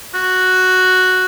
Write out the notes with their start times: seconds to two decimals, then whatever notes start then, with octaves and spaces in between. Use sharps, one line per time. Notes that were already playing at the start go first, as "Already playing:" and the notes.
0.14 F#4